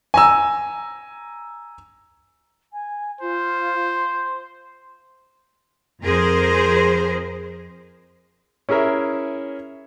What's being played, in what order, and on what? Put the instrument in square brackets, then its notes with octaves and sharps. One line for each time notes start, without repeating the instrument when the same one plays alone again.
[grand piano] G#5 A#5 E6
[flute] G#5
[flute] F4 [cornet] C5
[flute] C6
[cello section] F2 G#4 A#4 C5
[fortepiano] C#4 E4 G#4 A#4 E5